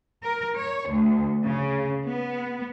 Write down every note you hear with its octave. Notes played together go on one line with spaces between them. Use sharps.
A#4
C#5
D2
C#3
B3